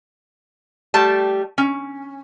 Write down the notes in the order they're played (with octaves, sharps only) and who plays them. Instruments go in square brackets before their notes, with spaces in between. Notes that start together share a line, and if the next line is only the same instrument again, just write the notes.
[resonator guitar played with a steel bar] G3 A3 G4 A5
C#4